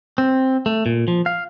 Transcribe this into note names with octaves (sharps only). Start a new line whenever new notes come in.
C4
A3
A#2
F3
F5